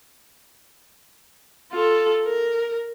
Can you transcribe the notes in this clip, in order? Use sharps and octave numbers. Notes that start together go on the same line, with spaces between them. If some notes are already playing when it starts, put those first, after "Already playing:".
F4 A4
A#4